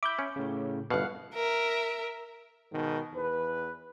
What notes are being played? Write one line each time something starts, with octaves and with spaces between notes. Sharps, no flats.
E5 B5 D6 G6
C#4
A2 C#3
G1 B2 F5 F#5 F#6
A#4 E5
G#2 B2 D#3
E2 B4